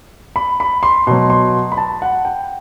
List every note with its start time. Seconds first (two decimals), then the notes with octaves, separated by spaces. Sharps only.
0.36 B5
0.60 B5
0.83 C6
1.07 B2 F#3 C6
1.30 C6
1.72 B5
1.77 A5
2.02 F#5
2.25 G5